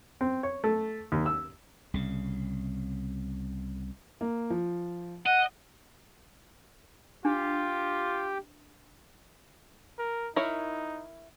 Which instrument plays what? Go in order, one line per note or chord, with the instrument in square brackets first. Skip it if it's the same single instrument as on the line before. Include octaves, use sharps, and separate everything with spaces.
[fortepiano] C4
C#5
A3
D#2
E6
[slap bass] C2 C#3
[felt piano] A#3
F3
[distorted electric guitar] D#5 [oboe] F#5
[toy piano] D4 [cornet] F4 [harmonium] G4 G5
[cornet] A#4
[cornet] D#4 [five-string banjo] E4 A#4 C#5